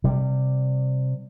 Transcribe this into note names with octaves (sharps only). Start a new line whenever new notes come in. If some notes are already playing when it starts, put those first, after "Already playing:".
C3 G3